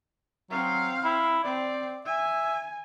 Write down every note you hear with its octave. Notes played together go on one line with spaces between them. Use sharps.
F#3 C4 F5
E4
C4 D5
E5 G#5